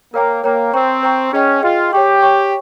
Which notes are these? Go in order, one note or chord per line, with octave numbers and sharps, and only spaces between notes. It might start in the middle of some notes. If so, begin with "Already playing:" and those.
A#3 A#4 C#5 G5 A#5
A#3 A#4 C#5 G5 A#5
C4 C5 G5 A#5 C#6
C5 G5 A#5 C#6
C#4 G#4 D#5 G5
F4 G#4 D#5 G5
G4 C#5 G5 C#6
C#5 G5 C#6